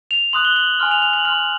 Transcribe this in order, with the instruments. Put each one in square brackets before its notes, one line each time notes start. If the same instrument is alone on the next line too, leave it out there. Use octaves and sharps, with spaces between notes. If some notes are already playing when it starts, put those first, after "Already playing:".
[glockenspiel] F7
C6 D#6 F#6 F#7
G7
F#7
G#5 C6 F6
F7
F7
F#7
C6 F6 F#7